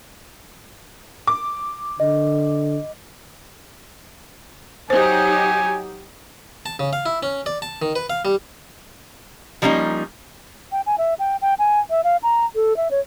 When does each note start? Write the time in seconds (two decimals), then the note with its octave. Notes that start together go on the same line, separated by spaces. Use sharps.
1.27 D6
2.00 D3 D#5
4.90 F#3 D#4 G4 C5 G#5
6.66 A5
6.79 C#3
6.93 F5
7.06 E4
7.23 C#4
7.46 D5
7.62 A5
7.82 D#3
7.96 B4
8.10 F5
8.25 G3
9.62 F3 G3 A#3 C#4 D#4
10.72 G5
10.86 G#5
10.98 E5
11.19 G5
11.42 G5
11.59 G#5
11.90 E5
12.04 F5
12.23 A#5
12.55 A4
12.77 E5
12.91 C#5